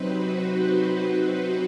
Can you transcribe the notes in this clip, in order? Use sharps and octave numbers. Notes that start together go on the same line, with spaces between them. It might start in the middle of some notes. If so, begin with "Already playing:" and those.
Already playing: C3 F#3 C4 D#4 B4 C5
F#4